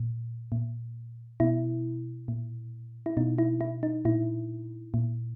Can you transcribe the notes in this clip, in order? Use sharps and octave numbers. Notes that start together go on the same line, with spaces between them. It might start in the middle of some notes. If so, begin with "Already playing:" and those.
Already playing: A#2
A#2
B2 E4
A#2
E4
B2 D#4
E4
E4
D#4
A#2 E4
A#2